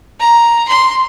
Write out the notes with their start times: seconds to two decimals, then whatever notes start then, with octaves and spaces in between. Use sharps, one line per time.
0.20 A#5
0.68 C6